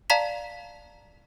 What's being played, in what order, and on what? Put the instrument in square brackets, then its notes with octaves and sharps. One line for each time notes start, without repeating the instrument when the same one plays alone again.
[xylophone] D5 F5 A5 A#5 B6 F7